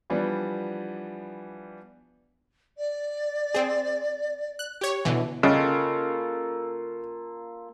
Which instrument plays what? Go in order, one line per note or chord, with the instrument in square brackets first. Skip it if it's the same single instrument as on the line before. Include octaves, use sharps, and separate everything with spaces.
[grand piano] E3 F3 G3 B3 D4
[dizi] D5
[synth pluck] C4 G#4
F#6
G4 C#5
B2 D3 E3
[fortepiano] C#3 [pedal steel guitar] A#3 F4 A4 [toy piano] C#4 D#5